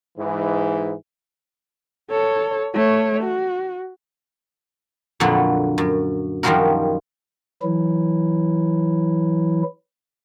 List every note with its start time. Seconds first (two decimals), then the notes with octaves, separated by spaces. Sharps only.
0.18 G#2 E3
2.11 A4 C#5
2.74 A3 C#5
3.23 F#4
5.20 F2 A#2 D3 F#3 B3 B5
5.78 F#2
6.43 F#2 D#3 F3 G3 F#4 A#4
7.62 E3 F#3 E4